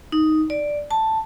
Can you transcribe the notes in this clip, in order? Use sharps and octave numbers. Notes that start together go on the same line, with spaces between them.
D#4
D5
A5